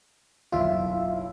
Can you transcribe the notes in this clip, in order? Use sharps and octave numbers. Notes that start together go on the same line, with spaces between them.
F#1 B1 E4 F4 E5